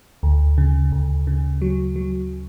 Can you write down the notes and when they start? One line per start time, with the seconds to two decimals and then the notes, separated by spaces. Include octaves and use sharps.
0.23 D2
0.58 C#3
0.92 D2
1.27 C#3
1.62 F#3
1.96 F#3